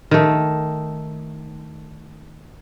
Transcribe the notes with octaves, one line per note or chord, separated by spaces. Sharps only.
D#3 A3